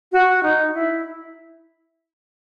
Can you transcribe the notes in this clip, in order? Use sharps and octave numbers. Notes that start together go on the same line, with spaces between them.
F#4
D#4
E4